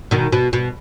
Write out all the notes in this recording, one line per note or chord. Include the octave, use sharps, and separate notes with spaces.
B2 D#3
B2
B2